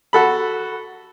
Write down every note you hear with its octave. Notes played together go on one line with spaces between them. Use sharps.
F#4 A4 B5